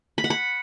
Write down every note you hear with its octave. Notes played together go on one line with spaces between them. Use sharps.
B5
F#5
B5